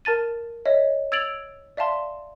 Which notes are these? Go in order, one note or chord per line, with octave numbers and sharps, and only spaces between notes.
A#4 A5 A6 D#7
C#5 D#5 E5
E6 G#6 A6 D7 F7 F#7
D5 E5 F5 A5 C6